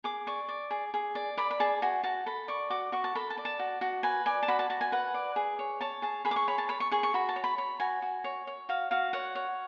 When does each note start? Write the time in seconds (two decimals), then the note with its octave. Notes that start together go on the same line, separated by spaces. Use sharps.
0.04 G#4 D6
0.27 D5 C#6
0.49 D5
0.71 G#4
0.94 G#4
1.15 D5
1.37 D5 B5
1.51 B5
1.60 G#4 A5
1.82 F#4 G#5
2.04 F#4 A5
2.26 A4 B5
2.48 D5 C#6
2.70 F#4 D6
2.92 F#4 C#6
3.04 A5
3.15 A4 B5
3.30 A5
3.38 D5
3.45 A5
3.59 F#4
3.81 F#4
4.03 B4 G#5
4.26 D5 G#5
4.43 A5
4.48 F#4 B5
4.59 A5
4.70 F#4 A5
4.81 G#5
4.92 B4 F#5
5.14 D5
5.36 G#4
5.59 C#5
5.81 C#5 A5
6.02 G#4 A5
6.25 G#4 B5
6.31 D6
6.36 C#6
6.48 C#5 B5
6.58 A5
6.69 C#5 B5
6.80 C#6
6.91 G#4 C#6
7.03 C#6
7.14 F#4 B5
7.29 A5
7.36 C#5
7.44 B5
7.58 C#5 B5
7.80 F#4 G#5
8.02 F#4
8.24 C#5
8.47 C#5
8.69 F#4 F5
8.91 F#4 F5
9.13 C#5 F#5
9.35 C#5